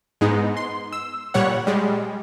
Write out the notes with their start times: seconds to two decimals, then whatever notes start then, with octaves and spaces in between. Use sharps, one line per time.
0.21 G#2 G#3 B3 D#4
0.57 C6
0.93 E6
1.34 A#2 G3 C#5 F#5
1.67 G3 G#3